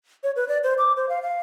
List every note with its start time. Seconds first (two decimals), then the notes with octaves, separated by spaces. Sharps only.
0.23 C#5
0.36 B4
0.48 D5
0.64 C5
0.78 D6
0.96 C5
1.09 F5
1.22 F5